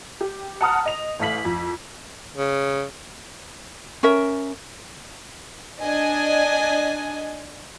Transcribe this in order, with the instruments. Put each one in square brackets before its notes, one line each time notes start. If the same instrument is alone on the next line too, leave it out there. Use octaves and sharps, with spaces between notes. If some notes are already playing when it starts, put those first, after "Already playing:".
[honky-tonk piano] G4
F#5 A5 A#5 D#6 F6
D#5 F7
A1 A3 F5 B6 F#7
F2
[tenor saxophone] C#3
[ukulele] C#4 A#4 E5
[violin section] D4 D#5 G#5